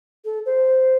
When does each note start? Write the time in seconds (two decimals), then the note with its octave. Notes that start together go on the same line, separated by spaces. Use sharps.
0.25 A4
0.46 C5